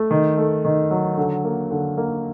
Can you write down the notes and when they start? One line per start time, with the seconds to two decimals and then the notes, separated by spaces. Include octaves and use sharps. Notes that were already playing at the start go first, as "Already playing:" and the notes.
Already playing: A3
0.11 D#3
0.37 A3
0.65 D#3
0.91 F#3
1.17 D3
1.44 A#3
1.71 D3
1.97 A#3